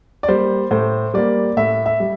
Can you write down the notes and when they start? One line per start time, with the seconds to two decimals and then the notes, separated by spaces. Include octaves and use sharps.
0.23 D5
0.28 G3 A#3 C5
0.71 A2 C5
1.14 G3 A#3 D5
1.57 A2 E5
1.86 E5
2.00 G3